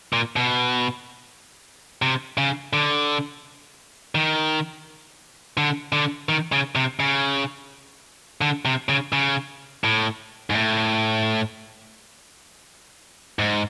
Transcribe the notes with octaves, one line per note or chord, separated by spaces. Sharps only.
A#2
B2
C3
C#3
D3
D#3
D3
D3
D#3
C#3
C3
C#3
D3
C3
C#3
C#3
A2
G#2
A2
G#2